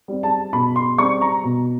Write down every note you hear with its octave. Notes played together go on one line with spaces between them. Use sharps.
G3 C4
A5
B2 B5
C6
G3 C4 C#6
A#5
B2